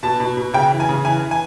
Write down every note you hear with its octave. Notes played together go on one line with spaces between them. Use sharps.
B2 A5
B2
B2
C#3 G5
E3
G#5
C#3
E3 G#5
E3
G#5